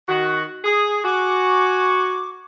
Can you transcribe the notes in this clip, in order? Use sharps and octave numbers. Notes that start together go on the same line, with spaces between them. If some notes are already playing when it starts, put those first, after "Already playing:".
D#3 F#4
G#4
F#4 G#5 C#6 D6